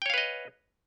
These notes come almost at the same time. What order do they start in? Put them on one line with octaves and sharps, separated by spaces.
G5 C#5 F5 B4 D#5